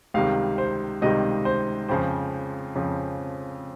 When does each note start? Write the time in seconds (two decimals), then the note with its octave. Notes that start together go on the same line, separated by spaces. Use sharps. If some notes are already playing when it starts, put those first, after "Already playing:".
0.14 C#2 C3 D#3 G3 F5
0.58 C5
1.02 C#2 C3 D#3 G3 D#5
1.45 C5
1.88 F2 C#3 F3 C5
2.75 F2 C#3 F3